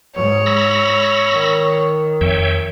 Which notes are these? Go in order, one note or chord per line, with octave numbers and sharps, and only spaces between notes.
G#2 C#5
B5 E6 A#6
D#3
F2 C#5 E5 G5